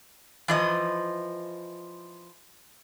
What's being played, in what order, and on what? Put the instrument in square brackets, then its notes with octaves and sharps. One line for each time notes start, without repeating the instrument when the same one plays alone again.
[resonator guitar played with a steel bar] E3 F3 D#5